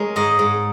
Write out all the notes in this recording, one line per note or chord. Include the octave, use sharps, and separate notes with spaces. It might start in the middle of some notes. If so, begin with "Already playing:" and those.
Already playing: G#3 A#4 C#5
G#2 D#5
G#2